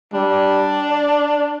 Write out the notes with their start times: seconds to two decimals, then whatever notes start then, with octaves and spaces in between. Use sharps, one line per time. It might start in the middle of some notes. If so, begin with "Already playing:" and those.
0.13 G3 D4
0.90 D5